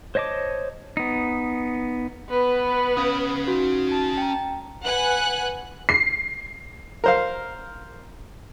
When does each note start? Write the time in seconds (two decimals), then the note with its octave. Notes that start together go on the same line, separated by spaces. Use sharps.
0.15 C5 C#5 D#5 A5 D6
0.97 B3 D#4
2.30 B3 B4
2.97 C#4 F5 D#6
3.48 D#4 F#4
3.88 A5
4.18 G5 A#5
4.84 B4 F#5 G#5 F#6
5.89 C7
7.04 A#4 C5 F5